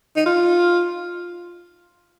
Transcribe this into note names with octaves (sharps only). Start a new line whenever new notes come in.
D#4
F4